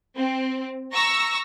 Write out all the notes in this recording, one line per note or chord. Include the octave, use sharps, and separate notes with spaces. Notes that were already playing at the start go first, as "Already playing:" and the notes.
C4
A#5 C#6 E6 A#6